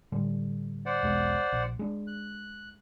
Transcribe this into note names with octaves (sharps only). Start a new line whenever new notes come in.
A2 D3 G3
C5 D5 F#5
E1 B1 G#3
A#1
G#3 D4
F#6